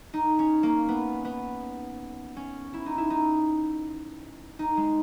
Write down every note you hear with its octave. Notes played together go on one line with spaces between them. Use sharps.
D#4
C#4
A#3
B3
B3
C#4
E4
D#4
E4
D#4
D#4
G#3